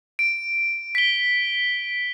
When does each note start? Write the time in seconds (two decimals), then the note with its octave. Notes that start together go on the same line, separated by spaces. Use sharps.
0.19 D7
0.95 B6 G7